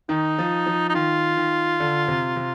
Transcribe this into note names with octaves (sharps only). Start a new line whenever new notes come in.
D#3 D#4
F3
F3
D#4
D#3 F4
D#3
D3
C3
C3